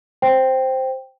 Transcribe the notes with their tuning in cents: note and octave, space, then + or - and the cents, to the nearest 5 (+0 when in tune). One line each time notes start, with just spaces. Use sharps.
C5 +0 G5 +0